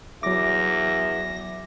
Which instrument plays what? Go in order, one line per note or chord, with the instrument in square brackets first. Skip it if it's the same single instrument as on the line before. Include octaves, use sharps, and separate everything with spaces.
[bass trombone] E2 [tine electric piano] F#3 D6 [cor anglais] E5 [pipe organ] A#6